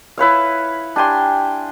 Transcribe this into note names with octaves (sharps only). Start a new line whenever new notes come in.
E4 B4 C#5 F5
D4 G4 G#5 C6